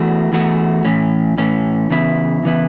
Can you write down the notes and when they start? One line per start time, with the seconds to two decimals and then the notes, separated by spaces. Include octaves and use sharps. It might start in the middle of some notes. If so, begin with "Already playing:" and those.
Already playing: E2 E3 A3 F#4
0.32 E2 E3 A3 F#4
0.85 A2 E3 C#4
1.38 A2 E3 C#4
1.90 C#3 E3 B3 E4
2.43 C#3 E3 B3 E4